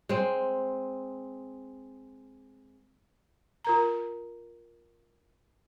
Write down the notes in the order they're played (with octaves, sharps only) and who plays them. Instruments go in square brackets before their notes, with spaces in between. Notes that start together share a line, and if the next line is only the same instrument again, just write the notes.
[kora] G#3 C4
[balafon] F4 A#4 A#5